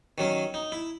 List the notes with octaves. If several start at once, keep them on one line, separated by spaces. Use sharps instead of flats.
D#3 F#3 C#4
D#4
E4